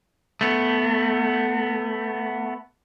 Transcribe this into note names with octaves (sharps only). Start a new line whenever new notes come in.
A3 B3